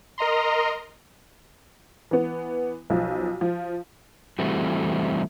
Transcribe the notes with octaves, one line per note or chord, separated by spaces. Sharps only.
A#4 D#5 A#5 C6
E3 B3
B1 F3
F3
E3 G3 A3 C4 F#4